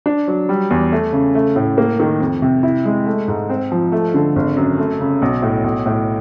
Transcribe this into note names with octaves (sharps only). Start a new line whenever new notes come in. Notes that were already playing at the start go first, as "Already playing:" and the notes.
D4
F#3
G3
E2
A3
C#3
A3
A2
A#3
D#3
F2
C3
E4
G#3
A3
G#2
C4
F3
A3
D3
G#1
F#2
A3
C#3
B1
A2
B1
A2